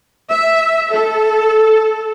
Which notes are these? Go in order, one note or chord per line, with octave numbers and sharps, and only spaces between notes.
E5
A4